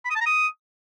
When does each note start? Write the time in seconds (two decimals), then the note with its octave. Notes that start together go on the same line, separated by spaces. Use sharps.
0.05 B5
0.10 D#6
0.16 A5
0.21 A#5
0.26 D#6